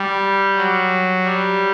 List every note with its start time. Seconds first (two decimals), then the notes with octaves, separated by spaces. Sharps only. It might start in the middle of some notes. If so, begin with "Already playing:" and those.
Already playing: G3
0.56 F#3
1.24 G3